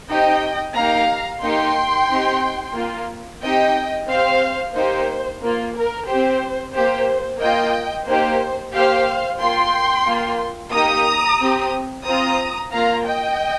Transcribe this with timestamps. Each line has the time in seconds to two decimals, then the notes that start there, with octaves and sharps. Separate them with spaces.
0.10 C4 D#4 G4 D#5 G5
0.76 A#3 D#4 G4 F5 A#5
1.43 A#3 D#4 G4 G5 C6
2.10 C4 D#4 G4
2.75 A#3 F4
3.42 C4 D#4 G4 D#5 G5
4.09 C4 G4 C5 F5
4.75 A#3 D#4 G4 C5
5.42 A#3 F4
5.76 A#4
6.09 C4 G4 C5
6.74 A#3 G4 C5
7.41 A#3 F4 D#5 G5
8.07 A#3 D#4 G4 C5
8.74 A#3 G4 C5 F5
9.40 A#3 F4 G5 C6
10.07 A#3 F4
10.73 A#3 D#4 G4 A#5 D#6
11.40 C4 G4
12.06 C4 F4 A#5 D#6
12.72 A#3 F4 F5 A#5
13.05 D#5 G5